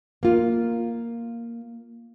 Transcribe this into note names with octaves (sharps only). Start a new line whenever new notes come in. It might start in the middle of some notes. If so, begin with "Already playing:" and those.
A#3 F4